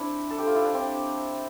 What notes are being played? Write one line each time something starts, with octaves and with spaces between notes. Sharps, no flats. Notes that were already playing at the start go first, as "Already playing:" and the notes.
Already playing: C4 D4 E4
A4
G4
F4
E4
D4
C4